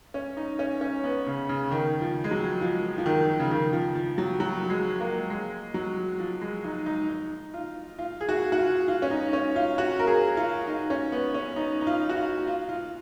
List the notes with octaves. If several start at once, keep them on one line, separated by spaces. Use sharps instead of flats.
C#4
D#4
C#4
C#4
B3
C#3
C#3
D#3
F3
G#3
F#3
F3
F3
D#3
C#3
D#3
F3
F3
F#3
F#3
G#3
A#3
G#3
F#3
F3
G#3
D#4
D#4
D#4
F4
F4
G#4
F#4
F#4
F4
F4
C#4
D#4
C#4
F4
F#4
A#4
G#4
F4
D#4
C#4
B3
C#4
D#4
D#4
F4
F#4
F4
F4
F4